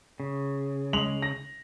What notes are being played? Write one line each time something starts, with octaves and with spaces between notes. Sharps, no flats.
C#3
G#3 F7 F#7
A#6